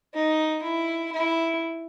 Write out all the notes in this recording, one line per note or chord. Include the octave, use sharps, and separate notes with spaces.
D#4
E4
E4